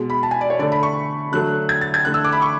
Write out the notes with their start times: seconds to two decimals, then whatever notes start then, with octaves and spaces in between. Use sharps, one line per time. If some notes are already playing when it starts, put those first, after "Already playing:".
Already playing: B2 G#3
0.10 B5
0.23 A5
0.31 G#5
0.41 D5
0.50 C#5
0.59 D3 A3 D5
0.72 B5
0.83 C#6
1.32 D3 F#3 A3 F#6
1.69 G#6
1.81 A6
1.94 G#6
2.05 D3 A3 F#6
2.14 E6
2.24 D6
2.32 B5
2.42 C#6